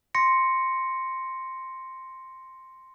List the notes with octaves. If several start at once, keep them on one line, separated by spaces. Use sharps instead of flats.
C6 A#6 C#7